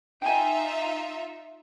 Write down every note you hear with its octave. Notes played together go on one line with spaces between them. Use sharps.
D#4 F4 E5 G5 G#5